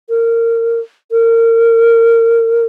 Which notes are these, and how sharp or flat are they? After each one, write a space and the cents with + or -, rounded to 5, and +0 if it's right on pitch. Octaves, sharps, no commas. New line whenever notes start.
A#4 -20
A#4 -25